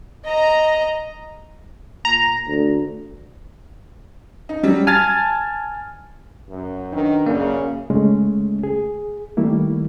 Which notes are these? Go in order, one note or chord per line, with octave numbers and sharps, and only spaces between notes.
D#5 A#5
A#2 A#5
D2
D#4
F#3 G3
G#5 A5 F6 G#6 A6
F#2
D#3 D4 A#4 B4
F#2 C#3 A#3 D5
C#3 G#3 A3 C#4
G#4
D#3 G3 A3 A#3 E4